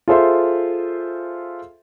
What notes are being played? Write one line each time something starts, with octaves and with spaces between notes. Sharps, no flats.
F4 G#4 A4 C5 E5 C6